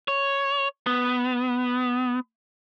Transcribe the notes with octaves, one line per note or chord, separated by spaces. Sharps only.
C#5
B3